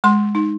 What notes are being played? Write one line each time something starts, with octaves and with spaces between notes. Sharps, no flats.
G#3 C6
D#4